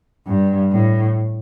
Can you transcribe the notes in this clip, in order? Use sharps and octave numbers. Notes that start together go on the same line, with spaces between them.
G2
A2